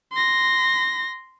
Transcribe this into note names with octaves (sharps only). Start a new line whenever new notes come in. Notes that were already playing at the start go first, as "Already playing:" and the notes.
C6 A#6